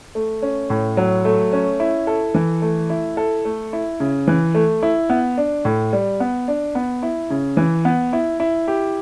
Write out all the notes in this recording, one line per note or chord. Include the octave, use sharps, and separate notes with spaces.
A3
C#4
A2
F#3
A3
C#4
E4
A4
E3
A3
E4
A4
A3
E4
C#3
E3
A3
E4
B3
D4
A2
G3
B3
D4
B3
E4
C#3
E3
B3
E4
E4
G4